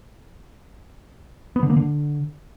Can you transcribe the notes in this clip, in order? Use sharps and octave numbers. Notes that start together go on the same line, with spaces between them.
B3
D3
A#3
D3